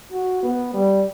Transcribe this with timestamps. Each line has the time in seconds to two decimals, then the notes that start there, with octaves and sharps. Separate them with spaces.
0.12 F#4
0.43 B3
0.73 G3